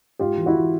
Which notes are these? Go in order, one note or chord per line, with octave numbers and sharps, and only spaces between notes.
G#2 F4 G4
E3
E4 F#4
E3